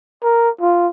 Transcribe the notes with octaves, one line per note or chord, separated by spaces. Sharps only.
A#4
F4